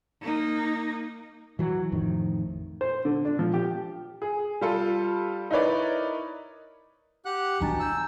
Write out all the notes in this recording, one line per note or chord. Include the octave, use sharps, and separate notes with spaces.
A#3 D#4
E3 F#3
A1 F2 A2 D#3
C5
D3
D4
F3
G4
G#4
G3 F4 A4
D#4 E4 A#4 B4 C#5 D5
G4 F#5 F#6
B2 E3 D4 G#5 A#5 A6
A#5 E6 G6